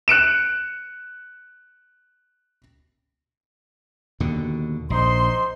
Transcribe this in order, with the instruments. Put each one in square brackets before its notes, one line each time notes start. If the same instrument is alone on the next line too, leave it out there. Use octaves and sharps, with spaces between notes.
[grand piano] F#6 C#7 D7 E7
[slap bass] D#2 B2 D3
[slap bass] A#1 [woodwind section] D#4 C5 C6